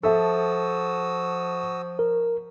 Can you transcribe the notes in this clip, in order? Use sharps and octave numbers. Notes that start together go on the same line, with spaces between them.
F3 F#4 A4 E5 D#6 E6
A#4